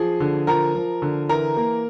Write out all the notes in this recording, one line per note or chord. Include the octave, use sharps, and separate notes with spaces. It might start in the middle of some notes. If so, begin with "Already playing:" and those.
Already playing: F3 G#4
D3
F3 A#4 A#5
F3
D3
E3 A#4 A#5
A#3